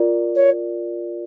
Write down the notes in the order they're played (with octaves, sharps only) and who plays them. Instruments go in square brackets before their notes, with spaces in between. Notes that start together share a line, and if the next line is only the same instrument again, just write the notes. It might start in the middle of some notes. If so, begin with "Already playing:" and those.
Already playing: [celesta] F4 A#4 D5
[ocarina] C#5